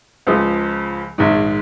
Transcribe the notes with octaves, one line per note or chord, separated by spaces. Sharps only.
C#2 C#3 F3
A#1 G#2 D#3